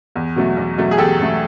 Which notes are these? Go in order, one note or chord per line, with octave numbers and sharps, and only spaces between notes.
E2
B2 F#3 A3
E2
B2 F#3 A3
G#4
E2 G4 A4
B2 F#3 A3